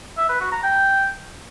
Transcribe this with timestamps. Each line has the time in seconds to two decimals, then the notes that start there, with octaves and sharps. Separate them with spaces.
0.18 E5
0.29 B4
0.41 F#4
0.52 A#5
0.64 G5